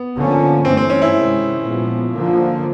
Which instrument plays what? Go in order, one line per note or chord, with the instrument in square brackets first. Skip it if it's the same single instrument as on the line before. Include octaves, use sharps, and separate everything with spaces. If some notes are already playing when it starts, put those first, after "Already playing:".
Already playing: [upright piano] B3
[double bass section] D3 F3 A#3 C#4
[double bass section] G2 E3 A3 [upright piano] C4
[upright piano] C4
C#4
E4
[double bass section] C3 D#3 G#3
A#2 F3 G#3 B3
D3 F3 A#3